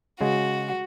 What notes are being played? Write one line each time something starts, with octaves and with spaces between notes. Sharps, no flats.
C#3 G#3 F#4